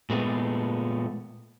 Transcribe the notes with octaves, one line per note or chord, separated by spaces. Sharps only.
A#2 G#3 A3 B3